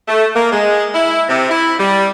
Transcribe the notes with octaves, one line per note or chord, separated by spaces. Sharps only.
A3
A#3
G#3
E4
C3
E4
G3